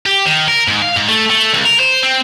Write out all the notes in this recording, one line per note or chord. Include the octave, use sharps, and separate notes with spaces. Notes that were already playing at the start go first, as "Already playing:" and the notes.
G4
D#3
A#4
G#2
F5
G#2
A3
A3
C#2
A#4
C5
C4